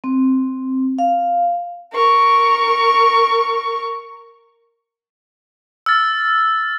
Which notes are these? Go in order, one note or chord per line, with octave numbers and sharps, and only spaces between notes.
C4
F5
A#4 C#6
E6 F6 A6